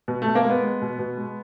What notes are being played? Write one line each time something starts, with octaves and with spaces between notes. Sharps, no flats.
B2
B2 A3
A#3
G#3
B3
G#3
B2
B2
G#3